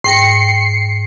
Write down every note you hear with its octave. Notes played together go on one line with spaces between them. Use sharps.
G#2 G5 A#6 C7 C#7